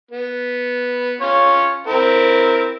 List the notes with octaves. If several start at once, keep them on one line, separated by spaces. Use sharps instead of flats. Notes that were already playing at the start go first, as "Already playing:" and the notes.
B3
C#4 F4 C#5
C4 E4 A#4